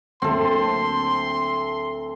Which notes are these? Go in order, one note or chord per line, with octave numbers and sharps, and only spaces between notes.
D2 F#3 A#3 C4 A4 C6